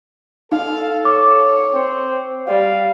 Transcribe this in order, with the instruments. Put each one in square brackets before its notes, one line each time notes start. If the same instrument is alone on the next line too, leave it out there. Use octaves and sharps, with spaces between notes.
[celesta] D#4 [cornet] A4 [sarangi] F5
[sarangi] C#5 [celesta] D6
[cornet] C4
[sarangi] G3 [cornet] F5